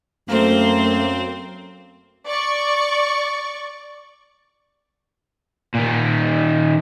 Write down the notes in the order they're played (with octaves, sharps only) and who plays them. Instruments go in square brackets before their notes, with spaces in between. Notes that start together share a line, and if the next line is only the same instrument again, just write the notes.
[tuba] F#2 [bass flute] A3 [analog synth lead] A#3 [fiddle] C4 C5
[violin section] D5 C#6
[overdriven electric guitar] A#2 D#3